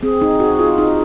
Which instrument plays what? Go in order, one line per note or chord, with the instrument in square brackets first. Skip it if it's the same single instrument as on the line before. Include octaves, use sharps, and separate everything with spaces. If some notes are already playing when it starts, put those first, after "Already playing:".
[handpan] C4 [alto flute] G#4
[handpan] D#4
F#4
F4
D#4